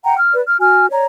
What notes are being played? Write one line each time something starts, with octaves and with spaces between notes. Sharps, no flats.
F#5 G5 A#5
F6
B4 D5
F6
F#4 G#5 F6
C#5 D5 A#5